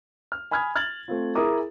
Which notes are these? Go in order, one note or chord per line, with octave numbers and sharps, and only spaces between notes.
F6
G#5 B5 D#6 F6 G#6
F6 G#6 A6 F#7
A3 C4 F4
E4 G#4 A#4 A#5 D6 D#6